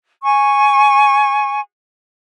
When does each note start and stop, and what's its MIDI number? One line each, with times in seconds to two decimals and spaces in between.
0.24 1.59 80
0.24 1.59 85